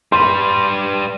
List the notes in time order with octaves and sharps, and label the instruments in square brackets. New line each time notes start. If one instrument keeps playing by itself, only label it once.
[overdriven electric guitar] G3 B4 [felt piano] C6